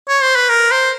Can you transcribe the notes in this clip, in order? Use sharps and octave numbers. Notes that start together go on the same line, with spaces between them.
C#5
C5
B4
A#4
C5